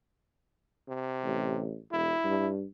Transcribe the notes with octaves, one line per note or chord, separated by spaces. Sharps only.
C3
A1
E1 E4
G2